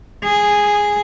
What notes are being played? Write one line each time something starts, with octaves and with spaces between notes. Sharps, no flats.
G#4